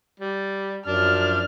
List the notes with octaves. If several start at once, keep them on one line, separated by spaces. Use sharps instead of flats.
G3
F#2 F3 D4 F6